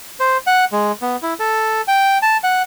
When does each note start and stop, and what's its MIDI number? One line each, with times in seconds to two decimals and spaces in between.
0.20 0.37 72
0.47 0.65 78
0.72 0.92 56
1.02 1.17 59
1.22 1.34 64
1.40 1.81 69
1.88 2.18 79
2.22 2.37 81
2.44 2.62 78